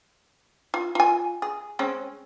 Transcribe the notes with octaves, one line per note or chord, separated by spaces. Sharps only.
F4
F4 G#5
G#4
G#3 C4 C#4